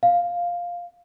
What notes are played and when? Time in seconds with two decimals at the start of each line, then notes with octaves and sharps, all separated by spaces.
0.03 F5